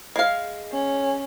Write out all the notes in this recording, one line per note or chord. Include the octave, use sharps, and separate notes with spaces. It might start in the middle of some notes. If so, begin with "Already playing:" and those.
G#3 F5
C#4